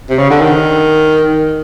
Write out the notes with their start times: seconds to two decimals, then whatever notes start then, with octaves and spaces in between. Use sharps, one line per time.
0.10 C3
0.18 C#3
0.30 D3
0.41 D#3